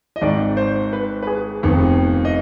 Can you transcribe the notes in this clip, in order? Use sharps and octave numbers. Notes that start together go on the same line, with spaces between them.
D#5
G#1 G#2 D#3 D5
C5
B4
B4
G#4
F1 F2 D#3 B3
D#5